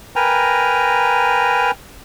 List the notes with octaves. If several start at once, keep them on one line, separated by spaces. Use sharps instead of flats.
A#4 B4 G5 G#5 A#5